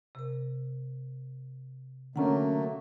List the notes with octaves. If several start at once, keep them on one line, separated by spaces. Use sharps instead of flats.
C3 A#4
D3 F#3 A3 A#3 C#4 F#5 A#5